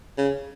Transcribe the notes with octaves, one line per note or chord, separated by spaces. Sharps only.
C#3